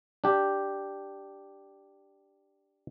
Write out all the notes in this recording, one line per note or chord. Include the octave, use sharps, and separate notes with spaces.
D4 G4